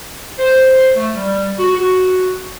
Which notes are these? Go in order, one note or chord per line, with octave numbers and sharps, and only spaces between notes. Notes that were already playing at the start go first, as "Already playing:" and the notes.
C5
A3
G3
F#4
F#4